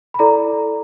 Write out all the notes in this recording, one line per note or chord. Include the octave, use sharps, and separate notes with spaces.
B5
E4 A4 D5 A#5